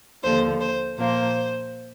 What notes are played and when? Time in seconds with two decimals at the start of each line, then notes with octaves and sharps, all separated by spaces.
0.23 D#2 D3 F3 C5
0.60 C5
0.98 A#2 F3 A#3 C5